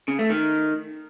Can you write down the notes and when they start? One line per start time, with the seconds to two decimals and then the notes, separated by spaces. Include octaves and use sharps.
0.08 C#3
0.19 A3
0.30 D#3